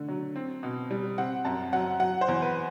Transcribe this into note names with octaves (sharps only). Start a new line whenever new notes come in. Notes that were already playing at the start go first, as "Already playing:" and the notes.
Already playing: D3 A3
F#3
C4
B2
G3
C4 F#5
F#2 A5
F#3 F#5
F#3 F#5
C5
E2
B4